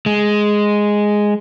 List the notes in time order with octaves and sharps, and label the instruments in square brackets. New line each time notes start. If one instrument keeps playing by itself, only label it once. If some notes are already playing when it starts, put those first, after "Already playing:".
[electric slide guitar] G#3